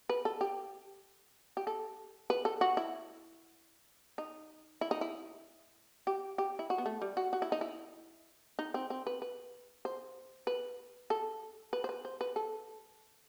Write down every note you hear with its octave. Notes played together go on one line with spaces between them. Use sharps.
B4
A4
G4
G4
A4
B4
A4
F#4
E4
D#4
E4
D#4
E4
G4
G4
E4
F#4
B3
A3
G3
F#4
F#4
E4
D#4
E4
D#4
C4
C4
B4
B4
C5
B4
A4
B4
C5
B4
C5
B4
A4